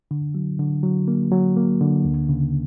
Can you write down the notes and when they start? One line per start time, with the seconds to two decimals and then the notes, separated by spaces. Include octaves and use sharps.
0.11 D3
0.35 F#3
0.59 D3
0.83 F#3
1.08 A#3
1.31 F#3
1.57 A#3
1.81 D3
2.04 D2
2.29 C#3